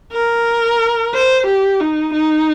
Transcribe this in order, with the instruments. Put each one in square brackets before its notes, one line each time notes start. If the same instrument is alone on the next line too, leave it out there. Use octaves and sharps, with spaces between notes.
[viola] A#4
C5
G4
D#4
D#4